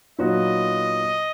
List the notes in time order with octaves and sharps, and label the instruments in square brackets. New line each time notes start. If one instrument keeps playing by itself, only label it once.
[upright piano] A#2 F#3 B3 D#4 F#4 [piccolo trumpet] D#5